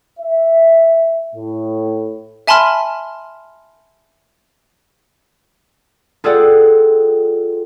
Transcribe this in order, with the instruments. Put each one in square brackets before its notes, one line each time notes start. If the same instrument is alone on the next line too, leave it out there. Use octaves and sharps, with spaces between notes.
[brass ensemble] E5
A2
[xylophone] E5 G#5 A5 B5 C6 F6
[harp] F4 G#4 A4 D5 F#5 G5